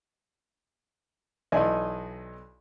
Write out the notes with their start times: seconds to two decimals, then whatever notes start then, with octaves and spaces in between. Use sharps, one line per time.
1.52 B1 E3 D#4 D5 D#5 G#5